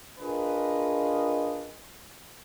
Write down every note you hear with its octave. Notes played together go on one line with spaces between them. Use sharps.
D4 F4 G#4 A#4 B4 D#5